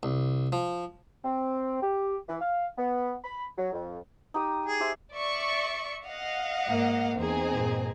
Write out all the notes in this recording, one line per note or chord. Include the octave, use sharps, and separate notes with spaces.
C2
F3
C4
G4
E3
F5
B3
B5
F#3
F2
D#4 G4 D#6
G#4
G4 C5 E5
D5 E5 C#6
D#5 F5 F#5
G#2 A#3
E2 C4 D#4 G#4
G2 A#2